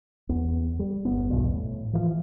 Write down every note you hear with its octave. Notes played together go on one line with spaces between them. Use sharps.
E2 B3
G3
G1 B3
B1 E2 G2 B2
A2
E3 F3